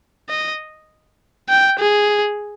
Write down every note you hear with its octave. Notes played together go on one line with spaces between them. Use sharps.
D#5
G5
G#4